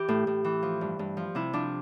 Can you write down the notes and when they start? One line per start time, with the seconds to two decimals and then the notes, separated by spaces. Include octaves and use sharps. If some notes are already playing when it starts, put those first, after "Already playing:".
Already playing: E3 G4
0.08 A2
0.27 A2
0.44 E3
0.63 F3
0.81 G2
0.99 G2
1.17 F3
1.35 C3 E4
1.53 F3 D4